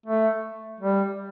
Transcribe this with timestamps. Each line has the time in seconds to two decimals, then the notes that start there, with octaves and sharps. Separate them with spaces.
0.06 A3
0.80 G3